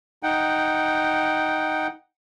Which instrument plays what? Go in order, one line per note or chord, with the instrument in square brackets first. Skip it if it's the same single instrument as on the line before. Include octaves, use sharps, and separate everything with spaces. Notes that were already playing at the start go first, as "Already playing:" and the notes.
[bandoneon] D#4 F#5 G5